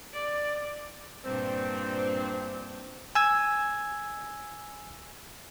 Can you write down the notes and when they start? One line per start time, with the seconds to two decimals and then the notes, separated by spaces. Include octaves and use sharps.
0.13 D5
1.25 G2 A#2 C4 D4
3.15 G#5 E6 G#6